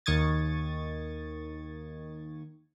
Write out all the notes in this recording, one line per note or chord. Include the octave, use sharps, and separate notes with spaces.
D#2 D#3 C#6 D#6 G#6 A6